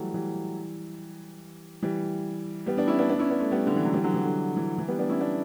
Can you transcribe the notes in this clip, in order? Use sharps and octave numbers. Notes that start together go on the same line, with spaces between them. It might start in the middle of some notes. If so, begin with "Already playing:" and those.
Already playing: E3 F#3 G3 A3
E3 G3
E3 G3
G3 B3
B3 D4
C#4 E4
B3 D4
B3 D4
C#4 E4
B3 D4
A3 C#4
G3 B3
D3
E3
F#3
E3 G3
D3 F#3
E3
D3
E3
E3
G3 B3
B3 D4
C#4 E4
B3 D4